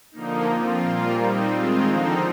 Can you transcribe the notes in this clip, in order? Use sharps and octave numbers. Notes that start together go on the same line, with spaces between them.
D3 F3 A#3 D#4
F3 C4 F4
A#2 G3 A#3 F4
G3 C4 D#4
D#3 G#3 C4 F4
D3 F3 C4 D#4